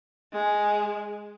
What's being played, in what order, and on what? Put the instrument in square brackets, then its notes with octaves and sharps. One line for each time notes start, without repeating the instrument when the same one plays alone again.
[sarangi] G#3